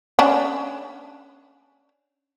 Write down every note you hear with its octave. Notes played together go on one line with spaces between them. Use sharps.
C#4 D4